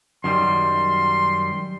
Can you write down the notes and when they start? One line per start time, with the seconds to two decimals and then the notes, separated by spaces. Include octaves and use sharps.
0.24 F#2 D#3 G3 C6